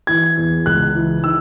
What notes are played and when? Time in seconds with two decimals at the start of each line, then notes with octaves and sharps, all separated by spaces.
0.07 E3 G#6
0.37 E2
0.66 C#2 F#6
0.95 E3
1.23 D#3 E6